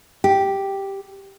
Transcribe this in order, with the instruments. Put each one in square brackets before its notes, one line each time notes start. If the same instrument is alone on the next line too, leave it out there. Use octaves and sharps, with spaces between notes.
[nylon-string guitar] G4